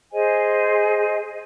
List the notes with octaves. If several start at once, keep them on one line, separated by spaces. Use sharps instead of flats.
G#4 C5 D#5 G#5